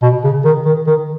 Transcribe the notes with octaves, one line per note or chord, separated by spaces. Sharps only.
B2
C#3
D#3
D#3
D#3